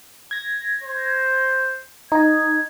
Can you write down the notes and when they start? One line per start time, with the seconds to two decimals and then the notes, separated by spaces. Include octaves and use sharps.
0.31 G#6 A#6
0.83 C5
2.12 D#4 D#5 G#6